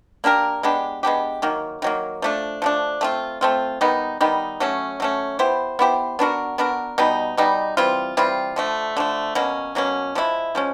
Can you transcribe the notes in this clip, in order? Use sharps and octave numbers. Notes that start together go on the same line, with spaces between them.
A#3 D4 G4 A#4
G#3 B3 D4 G4
G#3 B3 D4 G4
D#3 F#3 A#3
D#3 F#3 A#3
F3 A3 D4
F3 A3 D4
A3 C4 F4
A3 C4 F4
D#3 G3 B3 D#4
D#3 G3 B3 D#4
F#3 A3 C#4
F#3 A3 C#4
B3 E4 G4 C5
B3 E4 G4 C5
B3 D4 F#4 A#4
B3 D4 F#4 A#4
B2 G3 B3 D#4
B2 G3 B3 D#4
E3 G3 C4 F4
E3 G3 C4 F4
D3 F3 A3
D3 F3 A3
B2 F#3 A#3 C#4
B2 F#3 A#3 C#4
F3 G#3 C#4 E4
F3 G#3 C#4